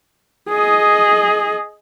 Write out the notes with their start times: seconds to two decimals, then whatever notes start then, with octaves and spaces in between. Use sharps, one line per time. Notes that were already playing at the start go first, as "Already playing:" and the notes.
0.49 G#4 D#5